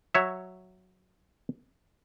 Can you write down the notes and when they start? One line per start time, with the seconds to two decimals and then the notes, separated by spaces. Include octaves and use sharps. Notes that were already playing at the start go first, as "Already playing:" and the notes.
0.15 F#3 C#5 E5